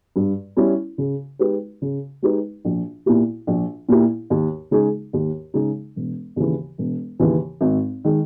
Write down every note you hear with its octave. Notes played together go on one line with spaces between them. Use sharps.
G2
G3 C#4 E4
C#3
G#3 D#4 G4 B4
C#3
G#3 D#4 G4 B4
A#1
A#2 A#3 E4 G4
A#1
A#2 A#3 E4 G4
D#2
C#3 G#3 D#4 G#4
D#2
C#3 G#3 D#4 G#4
E1
D#2 C#3 E3
E1
D#2 C#3 E3
G#1
D#3 G#3